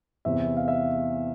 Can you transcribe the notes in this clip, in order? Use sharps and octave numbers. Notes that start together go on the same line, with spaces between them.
E2 C3 E3 E5
F5
E5